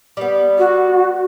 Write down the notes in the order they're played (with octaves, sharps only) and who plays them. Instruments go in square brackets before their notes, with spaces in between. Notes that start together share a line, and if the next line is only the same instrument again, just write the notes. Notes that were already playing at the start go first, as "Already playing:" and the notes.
[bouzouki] G3 B3
[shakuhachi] F#4